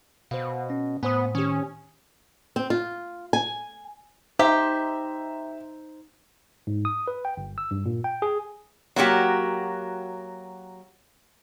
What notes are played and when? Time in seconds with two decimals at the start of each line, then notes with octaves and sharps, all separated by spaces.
0.31 B2 C5 F5
0.70 C#4
1.03 A2 B3 C5 G#5 D#6
1.35 D#3 C#4 G4
2.56 C4
2.70 F4
3.33 G#5
4.39 D#4 G4 C5 E5 A#5
6.67 G#2
6.85 D#6
7.08 B4
7.25 G5
7.37 G1
7.58 E6
7.71 G2
7.86 A#2
8.04 G5
8.22 G#4
8.96 F#3 A#3 F#4 G4